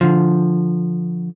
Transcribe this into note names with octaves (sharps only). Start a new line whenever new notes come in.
D3 F3